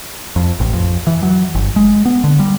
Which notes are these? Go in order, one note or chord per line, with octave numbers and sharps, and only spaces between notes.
F2
A1
F2
E3
F#3
G1
G#3
B3
D3
G3